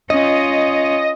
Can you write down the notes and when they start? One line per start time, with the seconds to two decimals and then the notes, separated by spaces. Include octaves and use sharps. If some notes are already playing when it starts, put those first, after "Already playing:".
0.10 C#4 F4 D#5